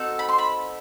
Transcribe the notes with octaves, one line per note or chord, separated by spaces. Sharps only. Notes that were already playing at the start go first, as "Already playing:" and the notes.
Already playing: C4 D#4 F#4 A4
B5
C6
B5